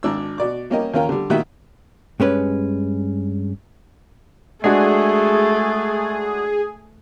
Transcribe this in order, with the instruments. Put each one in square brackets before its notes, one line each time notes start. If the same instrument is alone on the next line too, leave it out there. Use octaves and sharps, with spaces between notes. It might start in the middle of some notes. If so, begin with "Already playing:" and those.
[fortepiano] G#1 D4 E6
B2 D5 D6
G3 A#3 C#4 G4 A#4 D#5
D#2 C#4 F4 A#4 F5 G5
D3 G3
A#2 D#3 F#4 G4 E5 G5
[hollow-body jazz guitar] G2 G#3 C#4 B4
[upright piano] G#3 D4 F#4 [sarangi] A3 [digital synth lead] G#4